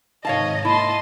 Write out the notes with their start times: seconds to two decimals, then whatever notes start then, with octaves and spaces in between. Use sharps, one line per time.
0.25 G#2 C3 D#3 C#5 D#5 F5 A5
0.65 A#3 E4 D#5 A5 C6